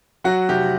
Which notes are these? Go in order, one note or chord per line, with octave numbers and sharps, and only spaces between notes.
F#3 F#4
F1 G4